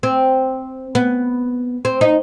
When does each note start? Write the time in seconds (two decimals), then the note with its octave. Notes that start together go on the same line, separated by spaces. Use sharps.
0.03 C4
0.95 B3
1.85 C4
2.01 D#4